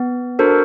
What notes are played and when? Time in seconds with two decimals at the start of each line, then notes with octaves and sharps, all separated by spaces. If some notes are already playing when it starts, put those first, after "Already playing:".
Already playing: B3
0.39 D4 F#4 A4 A#4 C5